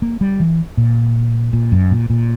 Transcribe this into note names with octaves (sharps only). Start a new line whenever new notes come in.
A#3
G3
E3
A#2
A#2
F#2
A#2
A#2